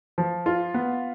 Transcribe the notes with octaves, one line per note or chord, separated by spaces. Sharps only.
F3
F4
B3